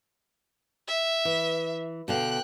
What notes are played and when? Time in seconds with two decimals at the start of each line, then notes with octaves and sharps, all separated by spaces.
0.88 E5
1.25 E3
2.08 B2 D3 F5 G5 F#6